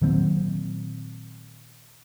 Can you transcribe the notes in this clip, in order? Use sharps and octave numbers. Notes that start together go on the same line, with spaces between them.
A#2 D#3 F#3 C4